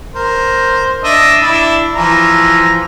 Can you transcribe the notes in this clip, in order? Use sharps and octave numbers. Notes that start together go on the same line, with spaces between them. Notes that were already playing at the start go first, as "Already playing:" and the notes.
A#4 C5
D4 D#5 E5
D4 E4
E3 F3 A#5